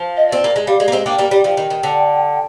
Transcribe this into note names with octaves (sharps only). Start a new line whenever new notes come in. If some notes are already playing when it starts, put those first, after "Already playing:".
Already playing: F3
D#5
C4 D5
A#3
G#3
G3 F5
G#3
A#3
G#3 C4
A#3 D4 G5
G3 A#3
G3
F3 G5
D#3
D#3
D3